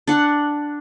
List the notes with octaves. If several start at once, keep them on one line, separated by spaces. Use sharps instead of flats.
D4 F#5